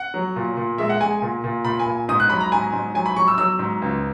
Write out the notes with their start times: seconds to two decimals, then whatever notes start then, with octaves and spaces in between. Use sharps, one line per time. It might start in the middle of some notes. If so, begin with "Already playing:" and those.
Already playing: F#5
0.14 F#3
0.36 A#2
0.57 A#2
0.78 G#3 E5
0.89 F#5
1.00 G#3 G#5
1.22 A#2
1.44 A#2
1.65 A#2 B5
1.79 G#5
1.86 A#2
2.08 G#2 D#6
2.20 F#6
2.30 F#3 B5
2.40 A#5
2.52 G#2 G#5
2.73 G#2
2.95 F#3 G#5
3.06 B5
3.16 F#3 C#6
3.28 E6
3.38 F#3 E6
3.59 G#2
3.82 C#2